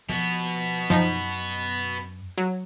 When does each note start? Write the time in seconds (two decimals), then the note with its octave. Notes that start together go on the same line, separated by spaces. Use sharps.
0.09 B2 F3 B3
0.90 F#2 F3 D#4
2.38 F#3